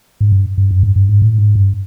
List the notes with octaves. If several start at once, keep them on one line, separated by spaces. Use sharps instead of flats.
G#2
G2
G2
F#2
G2
G2
G#2
A2
G#2
G2